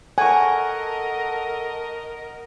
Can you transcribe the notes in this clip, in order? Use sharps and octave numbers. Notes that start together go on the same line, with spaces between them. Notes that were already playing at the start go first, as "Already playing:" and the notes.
A4 A#4 D#5 F#5 G#5 C#6